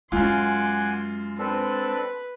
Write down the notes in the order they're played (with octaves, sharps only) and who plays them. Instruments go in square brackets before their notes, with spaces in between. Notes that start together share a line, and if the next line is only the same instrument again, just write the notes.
[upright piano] F#2 F4 [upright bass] G#3 [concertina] F#5 G#5 D6 [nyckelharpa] C6
[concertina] C4 D4 A4 [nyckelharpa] B4